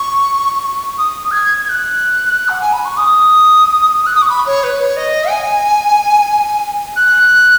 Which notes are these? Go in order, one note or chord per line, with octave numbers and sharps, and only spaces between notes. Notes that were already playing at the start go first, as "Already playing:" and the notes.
Already playing: C#6
D#6
G#6
G#6
F#6
F#5
G#5
B5
C#6
D#6
F#6
D#6
C#6
B5
C#5
B4
C#5
D#5
G#5
F#6